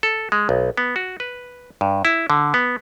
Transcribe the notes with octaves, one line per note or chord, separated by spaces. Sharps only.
A4
G#3
B1
B3
F#4
B4
G2
E4
D3
B3